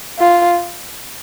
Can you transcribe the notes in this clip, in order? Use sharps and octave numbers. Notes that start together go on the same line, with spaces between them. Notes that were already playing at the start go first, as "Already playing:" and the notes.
F4